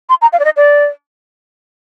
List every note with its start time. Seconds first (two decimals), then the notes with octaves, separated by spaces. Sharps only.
0.09 C6
0.22 A#5
0.33 F5
0.40 D5
0.45 D#5
0.57 D5